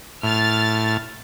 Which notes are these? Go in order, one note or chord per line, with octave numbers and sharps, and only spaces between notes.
A2 F6 A6